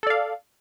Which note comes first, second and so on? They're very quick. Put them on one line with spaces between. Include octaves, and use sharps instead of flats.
A4 D5 F5